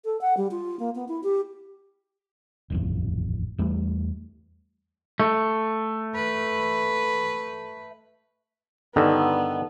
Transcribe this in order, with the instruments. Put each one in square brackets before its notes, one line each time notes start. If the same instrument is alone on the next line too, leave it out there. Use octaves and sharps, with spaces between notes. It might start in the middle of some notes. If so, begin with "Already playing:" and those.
[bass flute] A4
F#5
G3
F4
A#3
B3
E4
G4
[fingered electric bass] D#1 A1 F2
E2 G3 A3
[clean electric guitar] A3
[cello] B4
[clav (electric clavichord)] G2 D3 D#3 [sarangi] B3 [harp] D#4 A4